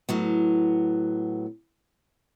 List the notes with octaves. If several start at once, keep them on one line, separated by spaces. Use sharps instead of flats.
A2 F#3 B3